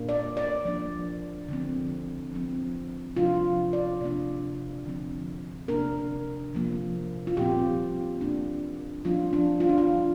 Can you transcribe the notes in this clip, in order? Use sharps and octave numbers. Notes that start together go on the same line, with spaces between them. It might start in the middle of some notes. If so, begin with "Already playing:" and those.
Already playing: A#2 A#3 D4
D5
D5
F3 A#3 D4
D3 F3 C4
F3 C4
C3 F3 D4 F4
D5
C3 A#3 D4
D3 F3 C4
C3 A#3 D4 A#4
C3 F3 A#3
F4
A#2 F3 C4 G4
A#2 A#3 D4
F3 A#3 D4 F4
D4
F4
D4
F4
F3 D4